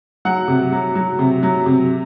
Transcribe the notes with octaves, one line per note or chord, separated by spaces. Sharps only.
F#3 F#5
C3
F#3
F#3
C3
F#3
C3